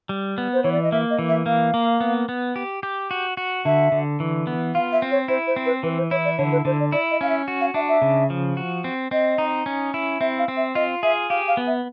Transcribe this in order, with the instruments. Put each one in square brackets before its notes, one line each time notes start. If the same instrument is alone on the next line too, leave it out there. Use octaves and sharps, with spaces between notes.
[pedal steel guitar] G3
B3
[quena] C5
[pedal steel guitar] E3 [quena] C#5
[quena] D5
D#5
[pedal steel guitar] A#3 [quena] E5
[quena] D#5
[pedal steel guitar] E3
[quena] E5
[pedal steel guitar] A#3 [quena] F5
[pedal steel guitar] A#3
B3
B3
G4
G4
F#4
F#4
[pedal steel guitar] D3 [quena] E5
[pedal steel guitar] D3
E3
B3
[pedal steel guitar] F4 [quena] F5
[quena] E5
[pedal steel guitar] C4
[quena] C#5
[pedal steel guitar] E4 [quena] C5
[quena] C5
[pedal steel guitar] C4
[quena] B4
[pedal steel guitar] E3 [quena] B4
[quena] C5
[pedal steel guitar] E4 [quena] C#5
[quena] D5
[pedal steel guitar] D3 [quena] C#5
[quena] B4
[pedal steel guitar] D3 [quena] C5
[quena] D5
[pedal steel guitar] E4 [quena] D5
[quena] D#5
[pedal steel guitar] C#4 [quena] F5
[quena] E5
[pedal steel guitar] F#4
[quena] F5
[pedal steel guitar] D4 [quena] E5
[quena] E5
[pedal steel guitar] C#3
F3
F#4
C4
[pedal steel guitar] C4 [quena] D#5
[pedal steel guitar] D#4
C#4
E4
[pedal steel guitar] C4 [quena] E5
[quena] F5
[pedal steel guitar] C4
[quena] E5
[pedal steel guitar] F4 [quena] D#5
[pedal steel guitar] G#4 [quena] E5
[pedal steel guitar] G4 [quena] F5
[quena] F5
[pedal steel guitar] B3
[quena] E5